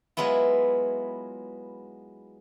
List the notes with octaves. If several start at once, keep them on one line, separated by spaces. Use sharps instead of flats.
F#3 G#3 B3 E4 F4